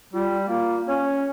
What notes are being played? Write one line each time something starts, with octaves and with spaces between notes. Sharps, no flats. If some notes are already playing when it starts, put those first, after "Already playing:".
G3 F4
A#3 F4
C#4 C#5